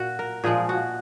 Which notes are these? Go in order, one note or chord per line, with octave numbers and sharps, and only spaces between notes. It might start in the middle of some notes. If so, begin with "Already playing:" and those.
Already playing: A#2 F#4
A#4
A#2 F3 G#3 G#4
F#4